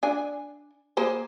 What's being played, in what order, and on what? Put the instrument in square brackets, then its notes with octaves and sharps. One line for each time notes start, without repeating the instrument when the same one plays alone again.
[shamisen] D4 G#5
A#3 G#4 C5